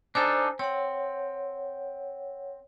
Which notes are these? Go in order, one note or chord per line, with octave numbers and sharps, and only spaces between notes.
D4 D#4 A4 C5 G#5 A#5
C4 C#5 F#5